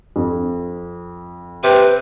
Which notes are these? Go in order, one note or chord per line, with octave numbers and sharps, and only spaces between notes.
F2
C3 B4